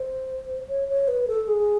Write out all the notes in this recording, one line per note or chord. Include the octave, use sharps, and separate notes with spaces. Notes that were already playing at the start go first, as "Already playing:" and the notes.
Already playing: C5
C#5
C#5
B4
A4
G#4